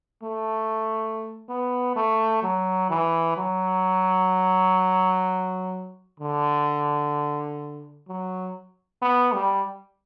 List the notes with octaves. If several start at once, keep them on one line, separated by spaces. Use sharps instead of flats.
A3
B3
A3
F#3
E3
F#3
D3
F#3
B3
G3